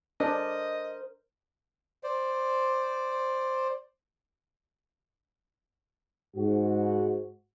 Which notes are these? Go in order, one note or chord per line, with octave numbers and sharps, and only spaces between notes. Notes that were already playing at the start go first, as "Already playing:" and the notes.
D4 A#4 C5 D#5
C5 D5
G#2 F#4